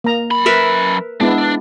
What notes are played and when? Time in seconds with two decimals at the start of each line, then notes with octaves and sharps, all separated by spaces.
0.04 A#3 A#5
0.31 F#2 B5
0.46 A#4 B4 E5
1.21 G#3 B3 D4 E4